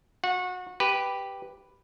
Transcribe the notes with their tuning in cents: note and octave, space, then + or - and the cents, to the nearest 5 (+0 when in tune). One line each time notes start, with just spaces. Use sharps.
F#4 -30 F#5 -25
G4 +0 B4 +0